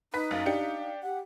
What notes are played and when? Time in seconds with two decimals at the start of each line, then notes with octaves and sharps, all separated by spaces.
0.14 D#4 B4 B6
0.31 F#1 F5
0.46 D4 G4 C#7
1.03 G4 F#5